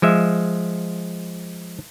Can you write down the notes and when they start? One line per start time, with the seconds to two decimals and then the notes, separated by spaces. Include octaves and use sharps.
0.02 F3 G#3 E5